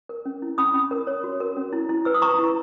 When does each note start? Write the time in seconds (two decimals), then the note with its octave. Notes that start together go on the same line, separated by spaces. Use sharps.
0.09 A#4
0.26 C#4
0.42 E4
0.58 C#4 B5 D#6
0.74 C#4
0.91 A#4
1.07 C#5
1.24 F#4
1.40 A#4
1.57 C#4
1.73 E4
1.89 E4
2.05 B4 E6
2.14 D#6
2.22 B4 A#5 C#6
2.39 E4